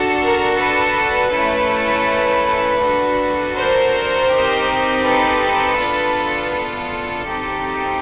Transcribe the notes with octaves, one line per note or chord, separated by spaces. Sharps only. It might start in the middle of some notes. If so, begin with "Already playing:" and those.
Already playing: D4 F#4 A4
A#4
A4 B4
A3 C#4 E4 A4
D4 F#4 A4
A#4 C5
C4 D#4 G4
A4 B4
B3 D4 F4
A4
C4 D#4 G4